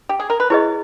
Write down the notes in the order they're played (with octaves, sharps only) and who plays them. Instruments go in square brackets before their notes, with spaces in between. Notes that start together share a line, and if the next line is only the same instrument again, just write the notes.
[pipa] G4
G#4
A#4
B4
[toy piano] E4 G#4 B4 D#5 [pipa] C#5